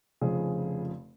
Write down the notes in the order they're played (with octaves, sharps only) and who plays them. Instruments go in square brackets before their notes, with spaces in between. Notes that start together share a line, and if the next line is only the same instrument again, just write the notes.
[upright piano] F1 F2 C#3 G#4